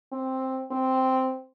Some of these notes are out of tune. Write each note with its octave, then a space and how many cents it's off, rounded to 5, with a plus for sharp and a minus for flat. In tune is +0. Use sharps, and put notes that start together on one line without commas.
C4 +5
C4 -5